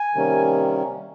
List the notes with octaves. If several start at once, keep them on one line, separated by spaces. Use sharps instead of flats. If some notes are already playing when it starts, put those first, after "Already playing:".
Already playing: G#5
C3 D#3 G3 A#3 C#4